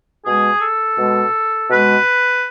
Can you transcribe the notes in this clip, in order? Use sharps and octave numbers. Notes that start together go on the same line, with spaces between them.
B2 G#3 G#4
A4
B2 G#3
B2 G#3 B4